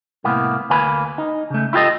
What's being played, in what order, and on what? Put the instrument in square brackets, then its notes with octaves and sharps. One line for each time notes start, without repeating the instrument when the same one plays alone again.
[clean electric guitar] C2 A2 A#3 B3
D2 A#3 B4 G#5 B5
D#4
C#3 A3
E4 F4 G4 A4 D#5